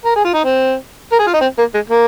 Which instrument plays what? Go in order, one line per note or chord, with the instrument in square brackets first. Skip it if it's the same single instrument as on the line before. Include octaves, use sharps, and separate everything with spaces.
[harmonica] A#4
G#4
F4
D#4
C4
A#4
G#4
F4
D#4
C4
A#3
G#3
A#3